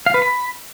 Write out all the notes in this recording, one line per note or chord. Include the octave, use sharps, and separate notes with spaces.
F5
B4
B5